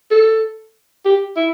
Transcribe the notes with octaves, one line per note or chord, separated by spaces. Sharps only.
A4
G4
E4